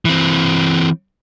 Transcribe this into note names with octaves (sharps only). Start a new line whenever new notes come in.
E3 C4